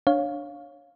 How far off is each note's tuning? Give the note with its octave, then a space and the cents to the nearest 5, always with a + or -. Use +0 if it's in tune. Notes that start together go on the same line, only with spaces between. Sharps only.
D4 +0 C#5 +0 F5 +10